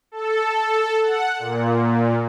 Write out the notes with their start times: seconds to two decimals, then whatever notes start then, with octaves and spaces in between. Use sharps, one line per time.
0.12 A4
1.03 F#5
1.39 A#2